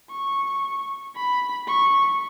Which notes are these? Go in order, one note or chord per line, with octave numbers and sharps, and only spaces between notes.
C#6
B5
C#6